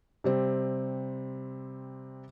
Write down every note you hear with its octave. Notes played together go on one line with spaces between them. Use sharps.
C3 G3 C4